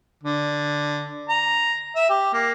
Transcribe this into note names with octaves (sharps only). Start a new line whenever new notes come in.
D3
A#5
E5
G4
A#3